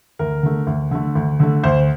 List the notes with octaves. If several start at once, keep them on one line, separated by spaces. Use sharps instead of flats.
D2 A#4
D3 A3
D2
D3 A3
D2
D3 A3
D2 C5